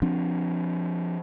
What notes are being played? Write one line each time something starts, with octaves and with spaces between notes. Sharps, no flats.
F3 C4 D4